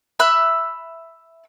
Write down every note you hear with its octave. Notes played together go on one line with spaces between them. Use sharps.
E5 B5 E6 F#6